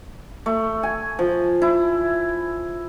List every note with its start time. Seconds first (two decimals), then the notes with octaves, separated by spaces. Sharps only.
0.46 A3
0.83 G#5
1.19 F3
1.62 E4